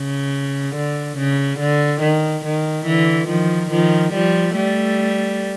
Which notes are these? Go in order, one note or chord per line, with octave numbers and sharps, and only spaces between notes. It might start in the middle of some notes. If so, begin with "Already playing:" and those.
Already playing: C#3
D3
C#3
D3
D#3
D#3
D3 E3
D#3 F3
D#3 F3
F3 G3
G3 A3